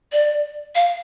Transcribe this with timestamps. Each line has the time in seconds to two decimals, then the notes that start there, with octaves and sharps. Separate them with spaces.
0.12 D5
0.75 F5